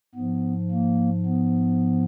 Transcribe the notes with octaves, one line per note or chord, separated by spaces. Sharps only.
G#2 F3 B3
A#3
B3